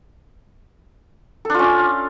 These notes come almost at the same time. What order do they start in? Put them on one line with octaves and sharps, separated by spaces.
A4 D4 F4 C#4